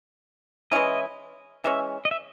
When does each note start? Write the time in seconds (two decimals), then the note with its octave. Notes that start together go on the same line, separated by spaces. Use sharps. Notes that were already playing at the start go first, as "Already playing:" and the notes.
0.71 E3 G#3 C#4 E4 D#5
1.64 E3 G#3 C#4 E5
2.05 D#5
2.11 E5